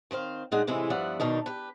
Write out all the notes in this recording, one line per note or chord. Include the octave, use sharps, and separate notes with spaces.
D#3 C4 C5 F5
A#2 G#3 D4 D#4 F#5
A2 C3 E3 G#3 E4
G2 F3 B3 D5 E5 F#5
B2 D#3 D4 D#4
G4 B4